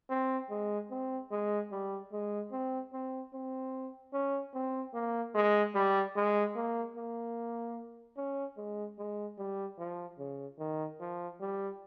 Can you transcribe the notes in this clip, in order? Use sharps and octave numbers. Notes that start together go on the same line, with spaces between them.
C4
G#3
C4
G#3
G3
G#3
C4
C4
C4
C#4
C4
A#3
G#3
G3
G#3
A#3
A#3
C#4
G#3
G#3
G3
F3
C#3
D#3
F3
G3